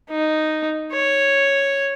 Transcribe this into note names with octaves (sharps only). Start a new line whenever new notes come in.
D#4
C#5